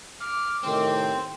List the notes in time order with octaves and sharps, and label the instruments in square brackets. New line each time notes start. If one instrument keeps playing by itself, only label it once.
[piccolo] D6 [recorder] F6
[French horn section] A2 C3 D#3 [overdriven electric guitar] C4 [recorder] C6